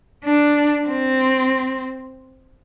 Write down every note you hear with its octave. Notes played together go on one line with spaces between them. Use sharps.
D4
C4